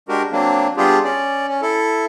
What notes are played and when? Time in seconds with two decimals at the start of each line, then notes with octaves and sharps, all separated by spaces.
0.09 G#3 D4 F#4 G4 A#4
0.32 F#3 A#3 C4 D4
0.77 G3 B3 D4 F4 G4 G#4
1.04 C#4 D5
1.48 C#4
1.62 E4 A4